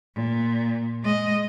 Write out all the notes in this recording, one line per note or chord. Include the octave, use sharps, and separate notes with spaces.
A#2
G#3 D#5